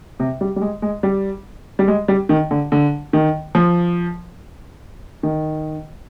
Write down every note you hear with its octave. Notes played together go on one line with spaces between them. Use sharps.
C3
G3
G3
G#3
G#3
G3
G3
G#3
G3
D#3
D3
D3
D#3
F3
D#3